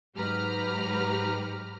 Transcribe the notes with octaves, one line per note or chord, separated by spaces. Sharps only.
G#2 F#3 G4 B4 A#5 F6